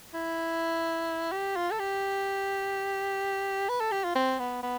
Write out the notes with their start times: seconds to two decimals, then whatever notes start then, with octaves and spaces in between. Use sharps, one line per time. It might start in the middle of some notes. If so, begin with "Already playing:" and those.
0.14 E4
1.32 G4
1.56 F4
1.71 A4
1.79 G4
3.69 B4
3.80 A4
3.91 G4
4.04 F4
4.15 C4
4.39 B3
4.63 B3